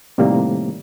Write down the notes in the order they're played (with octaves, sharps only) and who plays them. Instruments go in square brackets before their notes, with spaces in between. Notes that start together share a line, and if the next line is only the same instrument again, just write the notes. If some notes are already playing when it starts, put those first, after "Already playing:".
[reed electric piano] A2 C3 D#3 G3 A#3